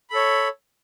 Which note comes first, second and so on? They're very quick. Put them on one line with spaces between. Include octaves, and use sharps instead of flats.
B5 A4 C#5